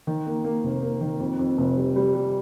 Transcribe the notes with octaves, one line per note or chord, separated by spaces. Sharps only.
D#3
A#3
A#3
F1
A#3
D#3
F2
F2
F1
G3
G3
G3